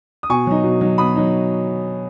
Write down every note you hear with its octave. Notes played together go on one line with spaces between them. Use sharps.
D#6
B2 G#5 C#6
F#3 D#4
B2
F#3 D#4
B2 B5 D#6
F#3 D#4